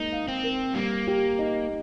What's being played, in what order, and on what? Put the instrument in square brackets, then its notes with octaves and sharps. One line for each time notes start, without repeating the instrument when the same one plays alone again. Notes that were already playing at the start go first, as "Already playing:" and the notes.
Already playing: [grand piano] G#3 A#3 [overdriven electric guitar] D#4
[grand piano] F5
[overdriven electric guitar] C4
[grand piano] A#4
[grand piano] G3 [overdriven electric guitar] A#3
[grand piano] G4
D#4